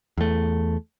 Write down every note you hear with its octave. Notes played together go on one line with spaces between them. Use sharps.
E2 A3